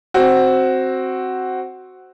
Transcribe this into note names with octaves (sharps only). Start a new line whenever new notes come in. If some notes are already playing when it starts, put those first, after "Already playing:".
C4 F#4